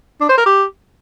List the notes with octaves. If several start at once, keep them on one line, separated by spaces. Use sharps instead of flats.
D4
C5
A#4
G4